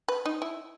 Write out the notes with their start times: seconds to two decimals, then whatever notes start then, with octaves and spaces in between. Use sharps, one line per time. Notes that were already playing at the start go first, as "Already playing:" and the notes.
0.08 B4
0.26 D#4
0.42 E4